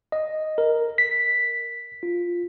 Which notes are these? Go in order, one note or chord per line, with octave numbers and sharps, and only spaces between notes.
D#5
A#4
B6
F4